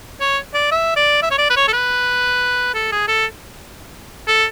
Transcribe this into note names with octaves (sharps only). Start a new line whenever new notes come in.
C#5
D5
E5
D5
E5
C#5
D5
B4
C#5
A4
B4
A4
G#4
A4
A4